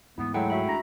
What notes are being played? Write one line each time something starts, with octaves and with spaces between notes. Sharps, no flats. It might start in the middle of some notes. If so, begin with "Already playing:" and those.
D2 G#2 E3 B3 E4
F#3 G#3 A3 E4 A4 F#5 G5
F#4 E5 B5
D2 D4 A#5